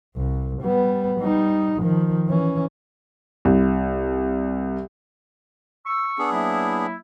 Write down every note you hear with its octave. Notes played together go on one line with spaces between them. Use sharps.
C2
G3 B3
G3 D#4
D#3 F3
E3 C#4
C2
C#6 E6
B3 D4 G#4
F#3 A#3 E4